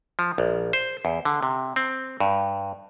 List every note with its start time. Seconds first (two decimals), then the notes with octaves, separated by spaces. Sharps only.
0.19 F3
0.38 A#1
0.73 C5
1.05 E2
1.25 D3
1.43 C3
1.76 C4
2.20 G2